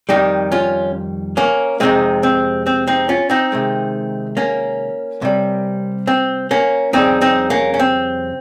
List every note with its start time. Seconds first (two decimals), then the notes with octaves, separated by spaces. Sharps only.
0.09 F2 D#3 G3 D#4 G4
0.52 C#4 F4
1.37 A#3 C#4
1.80 F2 C3 F3 G#3 C4 D#4
2.23 C4
2.66 C4
2.87 C4 D#4
3.09 C#4 F4
3.30 C4 D#4
3.52 C3 D#3 G#3
4.37 A#3 C#4
5.22 C3 G3
6.07 C4
6.51 A#3 C#4
6.93 F2 C#3 G3 C4 D#4
7.21 C4 D#4
7.50 A#3 C#4
7.74 C#4
7.79 C4